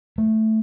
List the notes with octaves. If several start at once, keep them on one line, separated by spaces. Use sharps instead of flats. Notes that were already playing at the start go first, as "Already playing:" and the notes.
A3